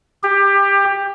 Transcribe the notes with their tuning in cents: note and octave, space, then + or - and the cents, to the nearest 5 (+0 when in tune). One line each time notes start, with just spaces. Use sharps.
G4 +20